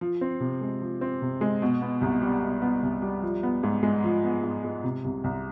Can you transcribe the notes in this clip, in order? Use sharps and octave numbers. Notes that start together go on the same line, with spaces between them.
F3
C4
C3
G#3
F3
C4
C3
G#3
B2
B3
C2
G3
B2
B3
C2
G3
F3
B3
G#2
G#3
F3
B3
G#2
G#3
C3
C2
C2